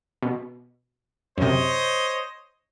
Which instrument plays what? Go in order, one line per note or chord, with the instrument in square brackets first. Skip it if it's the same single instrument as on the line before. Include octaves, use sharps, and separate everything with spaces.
[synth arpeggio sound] B2
[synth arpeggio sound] F#2 C3 [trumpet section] C5 C#5 D#5